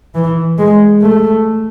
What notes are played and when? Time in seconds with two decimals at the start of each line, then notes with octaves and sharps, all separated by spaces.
0.15 E3
0.58 G#3
1.01 A3